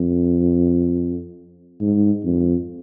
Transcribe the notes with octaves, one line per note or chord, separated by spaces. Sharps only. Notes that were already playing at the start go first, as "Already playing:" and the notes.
Already playing: F2
G#2
F2